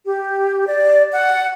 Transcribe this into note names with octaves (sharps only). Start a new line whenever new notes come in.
G4
D5
F#5